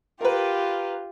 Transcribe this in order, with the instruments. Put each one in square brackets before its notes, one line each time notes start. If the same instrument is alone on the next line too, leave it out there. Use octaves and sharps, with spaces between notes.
[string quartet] F4 G4 [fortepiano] A#4 B4